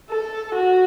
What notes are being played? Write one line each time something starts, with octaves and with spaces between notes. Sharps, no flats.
A4
F#4